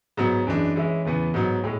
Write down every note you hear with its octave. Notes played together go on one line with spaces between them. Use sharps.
G#2 F#3 B3
F#2 E3 G#3 D4
E3 G#3 C#4 E4
E2 C#3 E3 B3
G#2 F#3 B3
A2 G#3